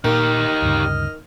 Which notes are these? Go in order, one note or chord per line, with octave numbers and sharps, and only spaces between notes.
A#2 D#3 D#4 G4 D#5 F6
D2 G2 C#3